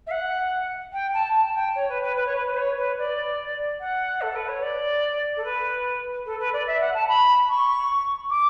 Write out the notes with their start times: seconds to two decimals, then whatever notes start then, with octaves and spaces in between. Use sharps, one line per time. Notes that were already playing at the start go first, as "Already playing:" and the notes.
0.06 E5
0.10 F#5
0.92 G5
1.13 A5
1.33 A5
1.54 G5
1.75 C#5
1.88 B4
2.02 B4
2.16 B4
2.26 C#5
2.35 B4
2.46 B4
2.57 C#5
2.77 B4
2.98 D5
3.80 F#5
4.21 A4
4.35 B4
4.48 C#5
4.62 D5
5.36 A4
5.44 B4
6.25 A4
6.40 B4
6.53 D5
6.67 E5
6.80 F#5
6.94 A5
7.08 B5
7.49 C#6
8.30 D6